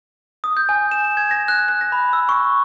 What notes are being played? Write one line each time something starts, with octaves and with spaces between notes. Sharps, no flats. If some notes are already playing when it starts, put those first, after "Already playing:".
D#6
G6
G#5
E7
G#6
A#6
F#6
F#6
A#6
B5
E6
C#6